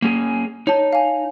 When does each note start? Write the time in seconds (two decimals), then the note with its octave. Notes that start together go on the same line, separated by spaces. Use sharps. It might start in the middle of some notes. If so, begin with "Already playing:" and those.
0.02 A#3 C#4 G#4
0.67 D#4 C#5 A5
0.93 F5 G#5